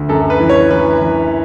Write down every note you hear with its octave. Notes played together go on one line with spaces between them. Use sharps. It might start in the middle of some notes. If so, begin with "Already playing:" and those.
Already playing: D2
F#2 A4
B4
E3
C#5
E3 B4
E3